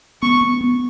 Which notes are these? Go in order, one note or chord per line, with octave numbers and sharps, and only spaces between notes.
B3 C#6
B3
B3